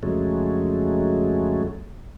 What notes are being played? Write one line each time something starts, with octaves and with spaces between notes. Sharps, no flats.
F2 C#3 F#3 G#3 A3